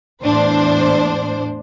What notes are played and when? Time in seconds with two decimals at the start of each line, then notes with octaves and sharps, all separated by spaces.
0.23 E2 A2 D4 C5